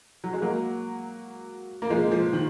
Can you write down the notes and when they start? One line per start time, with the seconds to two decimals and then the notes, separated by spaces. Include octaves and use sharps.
0.24 F#3
0.33 G#3
0.42 F#3 A#3
1.82 A#3
1.90 F3 G#3
2.11 F3
2.33 D#3